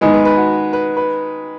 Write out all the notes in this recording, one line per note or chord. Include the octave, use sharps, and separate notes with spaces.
D#3 G#3 B3 D#4
B4
B4
F#4
B4
B4